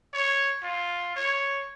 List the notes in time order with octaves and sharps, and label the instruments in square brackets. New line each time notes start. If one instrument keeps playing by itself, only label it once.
[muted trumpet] C#5
F4
C#5